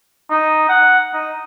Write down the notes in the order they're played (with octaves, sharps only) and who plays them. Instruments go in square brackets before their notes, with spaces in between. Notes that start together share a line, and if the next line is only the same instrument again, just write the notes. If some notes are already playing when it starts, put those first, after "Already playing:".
[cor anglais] D#4
F#5
D#4